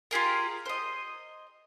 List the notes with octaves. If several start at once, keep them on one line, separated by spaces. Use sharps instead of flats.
F4 G4 G#4 A#4
C5 D#5